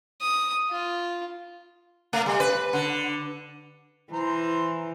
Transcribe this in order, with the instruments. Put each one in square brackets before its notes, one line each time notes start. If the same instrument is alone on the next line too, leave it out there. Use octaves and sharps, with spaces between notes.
[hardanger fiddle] D#6
F4
[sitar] A3
G3
B4
D3
[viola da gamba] E3 [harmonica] C5 A#5 C6